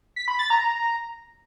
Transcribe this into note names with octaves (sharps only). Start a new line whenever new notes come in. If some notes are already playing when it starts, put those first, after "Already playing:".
B6
B5
A6
A#5